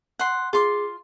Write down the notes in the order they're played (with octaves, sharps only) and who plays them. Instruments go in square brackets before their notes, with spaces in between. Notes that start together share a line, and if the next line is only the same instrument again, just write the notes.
[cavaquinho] F#5 C6
[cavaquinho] F4 C6 [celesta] G#4 D6